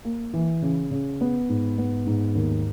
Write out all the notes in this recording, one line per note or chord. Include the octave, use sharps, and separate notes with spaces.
A#3
E3
C#3
C#3
B3
G#2
B3
G#2
D#2